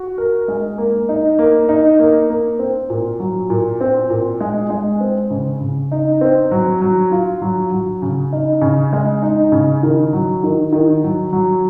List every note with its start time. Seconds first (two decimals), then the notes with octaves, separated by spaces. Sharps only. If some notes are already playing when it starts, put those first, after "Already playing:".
Already playing: F#4
0.18 A#4
0.48 G#3
0.78 A#3
1.09 D#4
1.39 A#3
1.69 D#4
1.99 A#3
2.30 A#3
2.59 C4
2.90 A#2
3.20 F#3
3.50 A#2
3.81 C4
4.10 A#2
4.41 G#3
4.70 G#3
5.01 C4
5.30 C#3
5.61 C#3
5.92 D#4
6.21 C4
6.51 F#3
6.81 F#3
7.12 F4
7.42 F#3
7.72 F#3
8.02 C#3
8.33 D#4
8.61 C#3
8.93 G#3
9.23 D#4
9.52 C#3
9.83 D#3
10.13 F#3
10.43 D#3
10.72 D#3
11.04 F#3
11.33 F#3